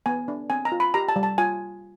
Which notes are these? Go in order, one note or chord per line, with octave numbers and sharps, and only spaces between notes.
B3 G#5
D4
C4 G#5
A#5
F4
B5
G4 A#5
A5
G3
A5
F4 G#5